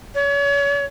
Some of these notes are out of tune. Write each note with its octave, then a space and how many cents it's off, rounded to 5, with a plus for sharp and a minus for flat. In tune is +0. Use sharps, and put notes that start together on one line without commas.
C#5 +35